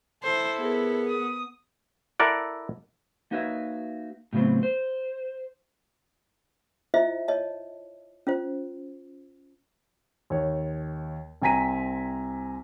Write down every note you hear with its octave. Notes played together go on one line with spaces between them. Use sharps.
E4 A4 C5
B3 G#4 A#4
D#6
E4 A4 A#4 D5 F#5
A#3 D#4 F#4 B4 C#5 E5
A2 C#3 F#3 B3 C4
C5
E4 F4 C5 D#5 E5
C#5 D#5 A5
C#4 F4 C5
D#2 C#5
C2 C4 G#5 A#5 B6 D#7